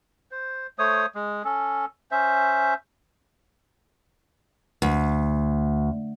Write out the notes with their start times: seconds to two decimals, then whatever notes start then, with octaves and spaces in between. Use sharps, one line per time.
0.31 C5
0.79 A3 C5 C#5 D#6
1.15 G#3
1.45 C#4 A4
2.11 C#4 C5 E5
4.82 D2